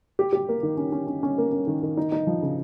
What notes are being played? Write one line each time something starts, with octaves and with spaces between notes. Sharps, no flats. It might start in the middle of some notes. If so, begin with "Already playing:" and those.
G4
G4
A#3
D#3
C#4
C#4
C#4
C#4
A#3
C#4
D#3
D#3
D#4
D#4
F3
C#3